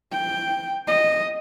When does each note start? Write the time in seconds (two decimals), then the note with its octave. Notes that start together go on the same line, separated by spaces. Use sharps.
0.12 G5
0.87 D#5